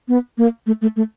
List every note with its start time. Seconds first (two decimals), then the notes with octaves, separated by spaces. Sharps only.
0.08 B3
0.38 A#3
0.67 A3
0.82 A3
0.96 A3